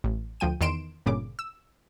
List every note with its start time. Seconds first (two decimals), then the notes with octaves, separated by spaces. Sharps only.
0.04 A1
0.40 D2 F3 G5 D#7
0.61 E2 D#3 C6 D7 E7
1.06 G1 A#2 C#3 D6
1.39 E6